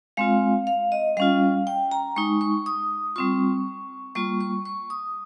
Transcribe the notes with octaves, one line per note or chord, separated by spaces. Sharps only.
G#3 C4 F4 F5
F5
D#5
G3 C#4 F4 F5
G5
A#5
G#3 D#4 C#6
C#6
D#6
G3 C4 F4 C#6
G3 A#3 F4 C#6
C#6
C#6
D#6